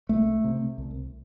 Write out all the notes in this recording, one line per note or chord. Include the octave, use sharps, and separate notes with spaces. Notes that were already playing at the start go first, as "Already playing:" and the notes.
C2 A3
C3
C2